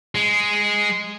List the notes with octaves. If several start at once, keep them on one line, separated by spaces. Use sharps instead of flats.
G#3